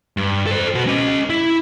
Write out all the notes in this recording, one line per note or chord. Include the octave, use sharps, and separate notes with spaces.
G2
A4 C5
B2 F#4
C#4 D#5
E4